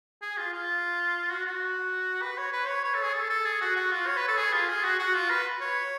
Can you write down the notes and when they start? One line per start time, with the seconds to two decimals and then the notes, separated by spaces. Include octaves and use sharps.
0.22 G#4
0.37 F4
0.53 F4
1.30 F#4
1.46 F#4
2.22 B4
2.38 C#5
2.53 B4
2.68 C#5
2.84 C#5
2.94 A4
3.04 G#4
3.14 A4
3.30 A4
3.45 G#4
3.61 F#4
3.76 F#4
3.92 F4
4.06 C#5
4.17 B4
4.28 A4
4.38 G#4
4.53 F4
4.69 G#4
4.84 F#4
4.99 F#4
5.15 F4
5.30 B4
5.61 C#5